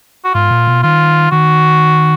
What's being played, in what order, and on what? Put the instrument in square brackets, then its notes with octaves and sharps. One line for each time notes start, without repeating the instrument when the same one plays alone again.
[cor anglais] F#4
[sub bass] G#2 [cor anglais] F4
[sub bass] A#2
B2
[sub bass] D#3 [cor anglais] F4
[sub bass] D#3 [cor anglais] F#4